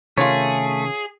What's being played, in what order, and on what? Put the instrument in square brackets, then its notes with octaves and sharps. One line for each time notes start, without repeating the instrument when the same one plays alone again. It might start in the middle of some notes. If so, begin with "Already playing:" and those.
[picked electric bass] C3 D#3 C#4 [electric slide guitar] A3 [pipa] F4 A#4 C#5 [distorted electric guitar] G#4